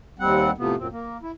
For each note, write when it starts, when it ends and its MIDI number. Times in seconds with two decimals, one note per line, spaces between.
0.19 0.51 39
0.19 0.51 55
0.19 0.51 60
0.19 0.51 78
0.58 0.75 45
0.58 0.75 48
0.58 0.75 53
0.58 0.75 59
0.77 0.87 42
0.77 0.87 46
0.77 0.87 60
0.92 1.17 58
1.22 1.32 64